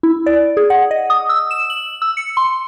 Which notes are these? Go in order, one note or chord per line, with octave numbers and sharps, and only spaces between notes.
E4
D5
G#4
F#5
D#5
D#6
E6
E7
F#7
E6
C#7
C6